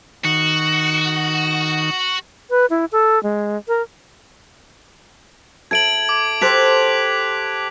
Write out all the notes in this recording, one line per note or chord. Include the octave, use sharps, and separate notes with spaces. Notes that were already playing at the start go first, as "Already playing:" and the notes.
D#3 F#4
B4
E4
A4
G#3
A#4
A4 E5 G#6 D7 F#7
D6
G4 A4 C5 F#6 B6 F7